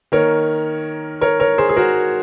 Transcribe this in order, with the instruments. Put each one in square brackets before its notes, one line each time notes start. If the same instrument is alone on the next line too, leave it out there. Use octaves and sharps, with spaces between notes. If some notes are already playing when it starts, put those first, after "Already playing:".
[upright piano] D#3 A#3 A#4 C#5
A#4 C#5
A#4 C#5
G#4 C5
G#4
F#4 A#4